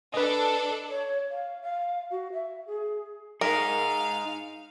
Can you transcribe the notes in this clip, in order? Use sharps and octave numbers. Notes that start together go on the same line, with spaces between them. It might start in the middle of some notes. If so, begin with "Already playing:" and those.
D4 A4 B4 D#5
C#5
F5
F5
F#4
E5
G#4
D#4 G#4 A#4 F5